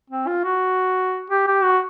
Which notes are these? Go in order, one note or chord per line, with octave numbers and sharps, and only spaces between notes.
C4
F4
F#4
G4
G4
F#4